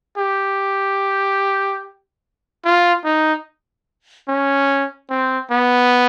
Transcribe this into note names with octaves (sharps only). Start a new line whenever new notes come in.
G4
F4
D#4
C#4
C4
B3